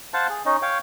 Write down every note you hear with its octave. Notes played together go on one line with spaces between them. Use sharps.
C5 F5 F#5 A5
G#4
C#4 D#4 D#5
C#5 F5 G5